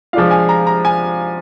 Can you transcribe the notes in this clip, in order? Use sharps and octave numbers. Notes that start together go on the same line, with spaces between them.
F3 G#3 D4 F4 F5
G#5
A#5
A#5
G#5